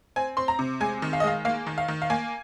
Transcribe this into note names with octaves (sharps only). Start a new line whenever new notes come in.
C4 G#5
C4 C6
A#5
C3
G#3 G#5
D#3
F5
D#5
G#3 F5
A#3 F5
D#3
F5
D#3
F5
A#3 G#5